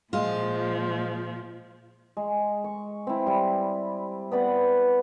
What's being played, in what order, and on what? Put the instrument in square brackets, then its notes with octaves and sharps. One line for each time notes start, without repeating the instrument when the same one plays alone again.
[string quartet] A#2 F3 [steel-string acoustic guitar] G#3 F4
[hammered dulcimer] G#3
C#6
C4 E4
G3
B3 B4 D5 F#5